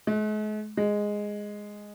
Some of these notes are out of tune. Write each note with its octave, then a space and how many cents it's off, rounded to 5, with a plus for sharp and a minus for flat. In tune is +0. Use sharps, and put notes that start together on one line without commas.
G#3 +45
G#3 -5